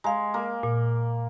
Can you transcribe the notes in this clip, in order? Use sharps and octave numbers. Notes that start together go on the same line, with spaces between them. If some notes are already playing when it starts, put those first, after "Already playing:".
G#3 F5 A#5
A#3
A#2